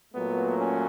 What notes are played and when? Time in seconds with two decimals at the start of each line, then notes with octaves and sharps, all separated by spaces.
0.13 A#2 F#3 A3 B3
0.58 C#4